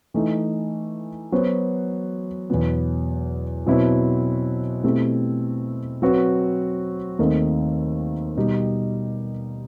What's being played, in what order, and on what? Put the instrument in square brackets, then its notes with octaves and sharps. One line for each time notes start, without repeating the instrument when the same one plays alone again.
[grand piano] E3 A3 D#4
F#3 B3 F#4 C5
E2 B2 F#3 B3
B2 F#3 C4 E4 B4
B2 A3 C4 E4 G4
F#3 C4 F#4 B4
D#2 D#3 A3 C4 D#4
B2 G3 D#4 G4